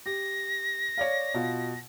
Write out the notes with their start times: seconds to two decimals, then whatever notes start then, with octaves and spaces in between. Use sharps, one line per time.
0.06 G4 A#6
0.98 C#5 D5 F5
1.34 B2 F4